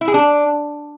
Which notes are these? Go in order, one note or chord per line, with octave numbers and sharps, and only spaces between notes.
E4
G#4
D4